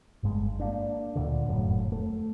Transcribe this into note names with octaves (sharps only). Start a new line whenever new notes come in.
G1 G2 G#3
A#3 D4
D2 A#2 D3
F1 F#2 A2
A3